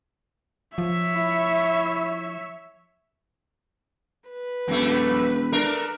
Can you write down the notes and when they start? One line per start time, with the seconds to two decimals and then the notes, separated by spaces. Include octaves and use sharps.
0.78 F3 C#5 E5
1.16 E4
4.29 B4
4.68 E1 F2 A3
5.52 A3 D4 A#4